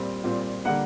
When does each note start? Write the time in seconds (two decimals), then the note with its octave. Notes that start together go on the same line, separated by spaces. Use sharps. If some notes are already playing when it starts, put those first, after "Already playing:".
Already playing: A#2 G3 C4
0.24 A#2 G3 C4
0.65 D3 G3 A#3 F#5